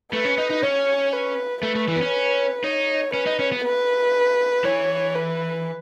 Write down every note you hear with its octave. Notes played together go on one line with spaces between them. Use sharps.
A3 B4
C#4
D#4
D#4
C#4 C#5
B4
A3 B4
A3
E3
B3
C#4
D#4 C#5
C#4 B4
D#4
C#4
B3
B4
E3 C#5
B4